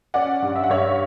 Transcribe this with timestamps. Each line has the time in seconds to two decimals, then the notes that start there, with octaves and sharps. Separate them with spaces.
0.14 C#4 D5 F#5
0.42 G2
0.56 E5
0.64 F#5
0.70 G2 C#5 E5